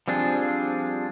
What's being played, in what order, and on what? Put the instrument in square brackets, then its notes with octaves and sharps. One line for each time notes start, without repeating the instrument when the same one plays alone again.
[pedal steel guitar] F3 G3 C4 D4 G#4